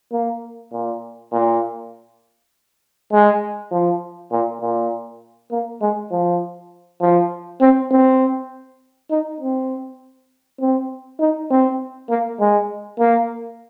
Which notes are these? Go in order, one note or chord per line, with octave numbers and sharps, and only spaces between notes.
A#3
A#2
A#2
G#3
F3
A#2
A#2
A#3
G#3
F3
F3
C4
C4
D#4
C4
C4
D#4
C4
A#3
G#3
A#3